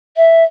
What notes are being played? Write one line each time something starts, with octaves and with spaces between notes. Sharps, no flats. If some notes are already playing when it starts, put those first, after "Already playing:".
E5